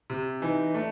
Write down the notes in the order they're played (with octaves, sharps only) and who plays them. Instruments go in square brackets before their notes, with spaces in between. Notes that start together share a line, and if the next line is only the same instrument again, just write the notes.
[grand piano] C3
[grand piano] E3 [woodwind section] D#4
[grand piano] A3 [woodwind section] D4